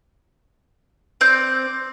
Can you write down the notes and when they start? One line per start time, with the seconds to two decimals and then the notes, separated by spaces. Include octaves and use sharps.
1.21 C4 D5 G6